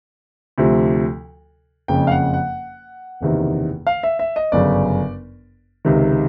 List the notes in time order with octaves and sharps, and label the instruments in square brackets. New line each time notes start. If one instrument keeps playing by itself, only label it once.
[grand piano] D2 C3 F3
F#1 F2 C#3 G5
F5
F#5
F#5
F#1 E2 C3 D#3
F5
E5
E5
D#5
G1 F#2 C#3 D5
C#2 C3 D#3